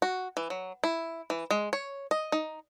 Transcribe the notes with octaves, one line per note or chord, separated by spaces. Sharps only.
F#4
E3
F#3
E4
E3
G#3
C#5
D#5
D#4